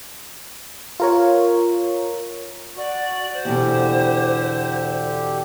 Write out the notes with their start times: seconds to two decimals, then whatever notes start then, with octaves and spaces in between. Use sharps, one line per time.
1.00 F4 A#4 C#5
2.77 F#4 D5
3.33 C5
3.45 E2 B2 D3 G4